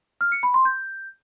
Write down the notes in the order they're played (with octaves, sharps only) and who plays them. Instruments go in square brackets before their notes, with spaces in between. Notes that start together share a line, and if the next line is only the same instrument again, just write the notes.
[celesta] F6
C#7
B5
C6
G6